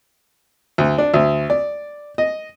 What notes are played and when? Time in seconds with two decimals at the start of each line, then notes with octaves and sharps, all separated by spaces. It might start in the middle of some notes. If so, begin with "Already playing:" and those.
0.78 D2
0.98 D4
1.14 D2
1.50 D5
2.18 D#5